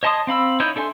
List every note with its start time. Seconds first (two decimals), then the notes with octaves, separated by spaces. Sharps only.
0.03 C#5 D#5 A5 C6 D#6
0.27 C4 F5 B5 E6
0.60 D#4 E4 C#5 A#5 G6
0.76 D4 A4 E5 G#5 C6